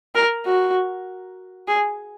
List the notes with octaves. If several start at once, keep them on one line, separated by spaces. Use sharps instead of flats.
A#4
F#4
G#4